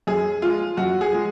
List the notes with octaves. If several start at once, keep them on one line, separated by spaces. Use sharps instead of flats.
F#2 G#4
F3 G#3 F4
F#2 F#4
G#4
F3 G#3